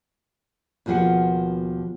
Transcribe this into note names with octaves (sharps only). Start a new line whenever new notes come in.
D#2 B2 F3 G#4 B4 F#5